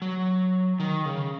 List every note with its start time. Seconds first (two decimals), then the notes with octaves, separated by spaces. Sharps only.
0.02 F#3
0.80 D#3
1.05 C#3